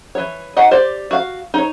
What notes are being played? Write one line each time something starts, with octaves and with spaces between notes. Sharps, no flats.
E3 C#5
D#4 F#4 D#5 F#5
G4 C5 D5
F#4 F5
D#4 C#5